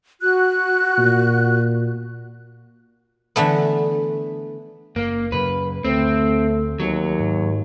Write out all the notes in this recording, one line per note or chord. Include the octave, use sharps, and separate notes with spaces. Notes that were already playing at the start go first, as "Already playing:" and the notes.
F#4 F#6
A#2
D3 E3 A3 B3
F#1 A#3
F#2 C#3 F#3 B4
D2 A3 C4
D#2 F#3
G#2